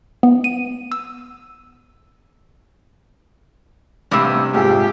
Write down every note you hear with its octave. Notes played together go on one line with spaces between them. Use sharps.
B3
D#7
E6
A1 G2 C3 D6 E6
A#1 F2 G#2 G4 G#4